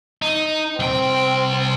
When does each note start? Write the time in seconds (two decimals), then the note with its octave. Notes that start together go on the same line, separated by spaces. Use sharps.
0.22 D#4
0.80 C2 C4 G5